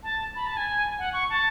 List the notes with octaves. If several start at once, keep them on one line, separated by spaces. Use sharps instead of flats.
A5
B5
A5
G#5
F#5
C#6
A5